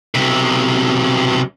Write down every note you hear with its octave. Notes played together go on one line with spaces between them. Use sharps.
B1 C3